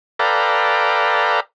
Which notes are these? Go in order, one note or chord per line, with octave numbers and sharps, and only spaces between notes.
A4 B4 D5 F5 G5 A#5